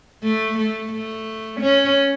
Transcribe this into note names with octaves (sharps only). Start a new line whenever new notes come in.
A3
A3
A3
C#4